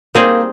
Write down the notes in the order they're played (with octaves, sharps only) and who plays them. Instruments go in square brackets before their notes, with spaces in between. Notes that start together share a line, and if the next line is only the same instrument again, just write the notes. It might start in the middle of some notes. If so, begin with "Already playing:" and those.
[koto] G3 C4 D#4 G#4 [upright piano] A#3